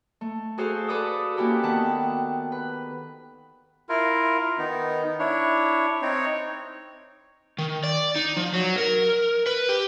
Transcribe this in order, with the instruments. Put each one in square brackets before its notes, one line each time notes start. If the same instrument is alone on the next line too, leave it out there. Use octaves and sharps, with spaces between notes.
[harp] A3
F#4 G#4 A4 C5 F5
A4 B4 D5 D6 D#6
A#3 C#4 E4 F#4 G4 A4
D#3 B3 C4 F#5 A5
B4
[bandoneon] E4 F4 A#4
D#3 B3 D#4
D4 E4 C#5
C4 D#4 C#5
[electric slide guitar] D#3
D5
D#4
F3
F#3
A#4
B4
G4